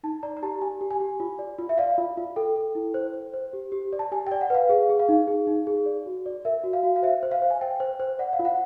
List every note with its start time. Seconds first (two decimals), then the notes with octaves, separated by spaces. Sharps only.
0.03 D#4 A5
0.23 D5 A#5
0.37 A#5
0.42 G4 A5
0.61 G4 G#5
0.81 G4
0.91 G#5
1.00 G4
1.20 F4
1.39 D5
1.59 F4
1.69 E5
1.78 D5 F5
1.98 F4
2.17 F4
2.36 A4 G5
2.56 A4
2.75 E4
2.94 C5
3.14 C5
3.34 C5
3.53 G4
3.72 G4
3.93 D5
3.99 A5
4.12 G4 G#5
4.27 D5 G5
4.41 F#5
4.50 B4 F5
4.69 G#4 F5
4.89 G#4
4.99 F5
5.09 D#4
5.27 G#4
5.47 D#4
5.67 G#4
5.86 D5
6.06 F#4
6.26 D5
6.45 A#4 E5
6.64 F#4
6.73 F5
6.83 F#4
6.96 F5
7.02 C5 E5
7.23 C5
7.31 F5
7.42 C5
7.50 G#5
7.61 C5 G5
7.80 C5
8.00 C5
8.19 D5 F#5
8.33 F5
8.39 F4
8.45 F#5